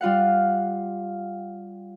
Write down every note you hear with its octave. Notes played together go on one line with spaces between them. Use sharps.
G3 F4 F5 F#5